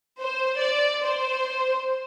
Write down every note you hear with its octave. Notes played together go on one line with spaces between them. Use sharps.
C5
D5
C5